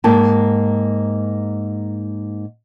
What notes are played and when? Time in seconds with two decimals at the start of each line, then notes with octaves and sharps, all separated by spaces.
0.04 G#2 A#3 G5 A5